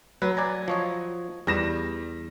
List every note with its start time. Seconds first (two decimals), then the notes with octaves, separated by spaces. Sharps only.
0.22 F#3 B4
0.37 D5 G#5 A#5
0.68 F3 C#5 D#5
1.47 E2 G3 A#6 E7